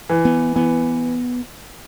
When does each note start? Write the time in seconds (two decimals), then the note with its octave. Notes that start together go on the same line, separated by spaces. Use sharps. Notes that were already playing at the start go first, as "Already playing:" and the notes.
0.09 E3
0.25 B3
0.55 E3 B3